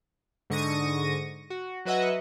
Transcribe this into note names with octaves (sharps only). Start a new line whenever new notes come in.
G#2 D3 C#6 D#6 A#6 D#7
F#4
F#3 F#4 B4 D#5 E5 F#5